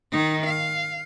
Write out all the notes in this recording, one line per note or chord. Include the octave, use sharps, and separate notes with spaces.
D#3 D#4
F5